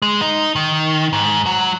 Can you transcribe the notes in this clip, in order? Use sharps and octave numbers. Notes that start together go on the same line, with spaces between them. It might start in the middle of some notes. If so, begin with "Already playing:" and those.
G#3
D#4
D#3
G#2
F#3